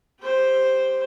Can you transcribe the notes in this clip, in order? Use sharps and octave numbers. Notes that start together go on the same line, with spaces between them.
G4 C5